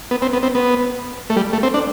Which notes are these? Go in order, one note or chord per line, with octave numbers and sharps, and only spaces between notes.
B3
C4
B3
C4
B3
A3
G3
A3
C4
D4